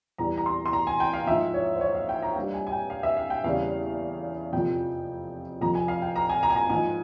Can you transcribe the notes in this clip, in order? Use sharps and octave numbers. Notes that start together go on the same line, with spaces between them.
E2 E3 G3 A#5
A#5
C6
C6
A#5
G#5
G5
F5
G#2 F3 E5
C#5
C5
C#5
F5
G5
A#5
F5
G2 G3 G5
G#5
G#5
G5
F5
E5
F5
G5
E2 C#3 G3 F5
F2 C3 F3 G5
F2 C3 F3 A#5
G#5
F5
G5
A#5
G#5
A#5
G#5
A#5
G#2 F3 G#5